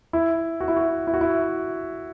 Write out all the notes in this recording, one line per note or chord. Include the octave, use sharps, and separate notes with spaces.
E4
F#4
E4
F#4
E4
F#4
E4